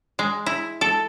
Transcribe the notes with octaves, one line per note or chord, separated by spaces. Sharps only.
G#3
E4
A4